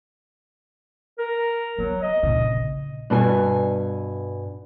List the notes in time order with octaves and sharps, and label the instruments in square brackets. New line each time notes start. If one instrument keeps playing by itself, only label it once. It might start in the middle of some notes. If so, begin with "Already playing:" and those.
[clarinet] A#4
[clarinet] F#3 [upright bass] B3
[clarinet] D#5
[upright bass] A#1 C#3
[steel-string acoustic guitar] G2 B2 G4 G#5